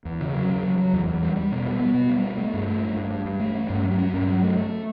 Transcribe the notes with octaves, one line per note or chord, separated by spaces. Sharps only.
E2
C#3
F#3
C#3
F#3
F#3
E2
E2
G3
G3
B2
G3
B3
B2
G3
B3
A3
G2
A3
G2
G2
G2
G2
A3
C#4
G2
F#3
C#4
G2
F#3
A3
A3